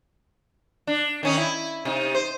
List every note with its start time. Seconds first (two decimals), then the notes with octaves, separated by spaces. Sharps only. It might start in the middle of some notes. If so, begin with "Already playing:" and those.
0.87 D4
1.23 D#3 C#4 D#4
1.38 E4
1.85 C3 D#4
2.15 C5